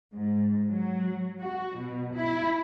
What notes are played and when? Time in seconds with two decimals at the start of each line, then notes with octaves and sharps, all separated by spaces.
0.12 G#2
0.70 F#3
1.40 F#4
1.78 B2
2.13 E4